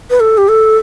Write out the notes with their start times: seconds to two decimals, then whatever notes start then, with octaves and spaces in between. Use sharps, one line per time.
0.10 B4
0.20 A4
0.38 G4
0.48 A4